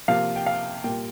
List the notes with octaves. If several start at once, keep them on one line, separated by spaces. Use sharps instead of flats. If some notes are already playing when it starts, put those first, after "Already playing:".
C3 F3 A#3 F5
G5
F5
A#2 G3 A#3 G5